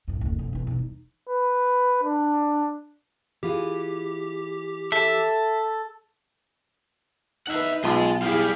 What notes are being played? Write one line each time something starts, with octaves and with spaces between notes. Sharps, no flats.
A1 F2
F#1 D2
F2 B2
B1 E3
E2 B2
D#4
B4
D4
E3 F4 G4 G#4
A4 E5
D#4 B4 E5 F#5
B1 F4 G#4 D#5
G3 E4 G4 G#4 F5